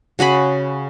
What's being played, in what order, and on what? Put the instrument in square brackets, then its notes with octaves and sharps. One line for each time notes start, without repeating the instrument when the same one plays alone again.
[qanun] C#3 F#4 G#4 B5